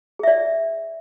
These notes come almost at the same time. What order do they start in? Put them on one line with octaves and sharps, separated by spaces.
G#4 E5 D5